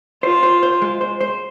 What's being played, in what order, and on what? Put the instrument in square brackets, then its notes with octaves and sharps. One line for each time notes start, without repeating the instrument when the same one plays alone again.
[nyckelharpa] F4 [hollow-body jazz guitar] C5
[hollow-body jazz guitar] C5
C5
G#3
C5
C5